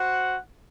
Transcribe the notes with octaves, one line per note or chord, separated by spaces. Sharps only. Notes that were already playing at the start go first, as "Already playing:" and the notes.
Already playing: F#4 C5 F#5